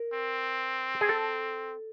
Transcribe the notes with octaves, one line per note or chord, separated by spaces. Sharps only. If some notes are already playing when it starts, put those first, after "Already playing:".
Already playing: A#4
C4
G#4
A4